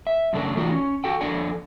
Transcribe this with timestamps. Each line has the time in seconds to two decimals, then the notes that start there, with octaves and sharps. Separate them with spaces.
0.07 E5
0.33 F#2 C#3 A3 D4 A#4
0.57 E3 A3 D#4 F4 F#4 D5
0.72 C#4
1.04 F#4 A4 G5
1.21 F2 D4 A4 D5 G#5